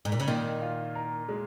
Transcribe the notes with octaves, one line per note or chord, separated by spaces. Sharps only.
G#2
A#2
C#3
A#2 D#3
F4
A#4
G#3